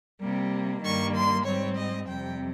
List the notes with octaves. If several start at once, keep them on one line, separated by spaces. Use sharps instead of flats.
C3 G3 A#3
G2 D#3 G3 A#3 C#6
C6
G#2 G3 C4 C#5
D#5
F2 C3 G3 G5